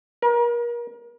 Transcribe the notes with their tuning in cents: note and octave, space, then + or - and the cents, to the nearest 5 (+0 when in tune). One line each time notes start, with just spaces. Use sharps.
A#4 +35